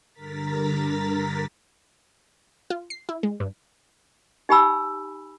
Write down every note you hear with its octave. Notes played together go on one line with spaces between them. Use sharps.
G2 D3 A#4 A#5 A6 B6
F4
C7
E4
G#3
G2
D#4 G4 G#5 B5 E6